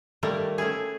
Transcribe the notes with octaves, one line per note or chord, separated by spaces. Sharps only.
D#3 G3 A3 A#3
A3 C#4 E4 G#4